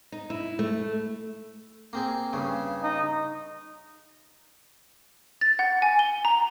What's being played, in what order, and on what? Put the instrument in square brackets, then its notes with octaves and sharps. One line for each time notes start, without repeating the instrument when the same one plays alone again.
[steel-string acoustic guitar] D#4
E4
A3
[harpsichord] A#3 C4 G#4
G2 C#3
[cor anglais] D#4
[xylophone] A6
F#5
G#5
G7
A#5